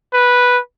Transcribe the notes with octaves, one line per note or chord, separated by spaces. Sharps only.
B4